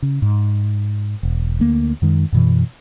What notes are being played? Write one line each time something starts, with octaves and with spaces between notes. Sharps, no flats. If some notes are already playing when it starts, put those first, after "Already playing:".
C#3
G#2
E1
D2 A#3
F#2 D#3 G#3
F#2 B2 E3